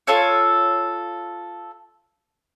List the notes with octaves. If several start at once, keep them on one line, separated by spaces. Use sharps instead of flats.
F4 A4 C#5